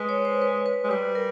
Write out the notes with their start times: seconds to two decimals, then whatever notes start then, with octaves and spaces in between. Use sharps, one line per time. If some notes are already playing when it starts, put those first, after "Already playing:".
Already playing: G#3 B4
0.09 C#5
0.25 C5
0.42 B4
0.66 B4
0.84 G#3
0.90 G3 B4
1.15 A#4